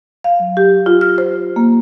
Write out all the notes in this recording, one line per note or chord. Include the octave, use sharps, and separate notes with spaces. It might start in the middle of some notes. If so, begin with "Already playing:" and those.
F5
F#3
G4
F4
F6
C5
A#3